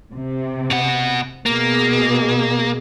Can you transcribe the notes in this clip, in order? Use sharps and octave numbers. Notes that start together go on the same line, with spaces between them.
C3
B2 F#5
B2 A#3 G#4